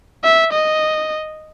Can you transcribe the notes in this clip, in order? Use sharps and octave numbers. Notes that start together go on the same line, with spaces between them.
E5
D#5